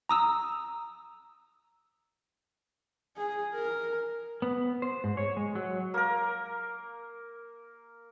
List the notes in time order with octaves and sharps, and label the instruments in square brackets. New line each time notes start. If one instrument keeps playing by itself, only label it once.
[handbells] A#5 D#6 E6
[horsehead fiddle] G#4
A#4
[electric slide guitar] B3
C5
G#2
C#5
G#3
F#3
[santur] A#3 A#4